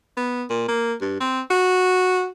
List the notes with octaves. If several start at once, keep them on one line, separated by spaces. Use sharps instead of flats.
B3
A#2
A#3
G2
C4
F#4